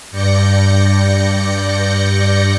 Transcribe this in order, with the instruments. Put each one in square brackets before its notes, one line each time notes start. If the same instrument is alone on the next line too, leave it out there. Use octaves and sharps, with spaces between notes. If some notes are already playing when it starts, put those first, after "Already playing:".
[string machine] G2 D5 G6 A#6 C#7